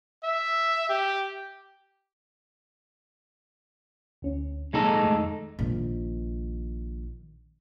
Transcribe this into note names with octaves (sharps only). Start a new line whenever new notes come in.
E5
G4
D2 C#4
A#2 G#3 D#4 A4 A#5 A#6
F2 D#3 A3
A#1 D#3